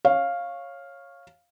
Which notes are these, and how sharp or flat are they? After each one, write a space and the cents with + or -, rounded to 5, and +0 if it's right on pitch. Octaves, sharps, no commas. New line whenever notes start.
C#5 -10 F5 +0